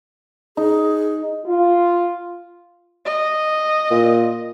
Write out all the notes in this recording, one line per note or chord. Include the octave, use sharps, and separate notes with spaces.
D#4 G#4
F4
D#5
A#2